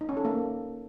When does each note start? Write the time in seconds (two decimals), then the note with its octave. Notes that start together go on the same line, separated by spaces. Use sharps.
0.01 D#4
0.09 C#4
0.17 A4
0.25 A#3